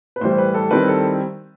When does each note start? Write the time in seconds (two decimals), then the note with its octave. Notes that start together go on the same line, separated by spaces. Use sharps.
0.16 B4
0.21 A2 E3 G3 C5
0.31 C5
0.38 B4
0.54 A4
0.71 D#3 G3 C4 E4 B4
0.88 A4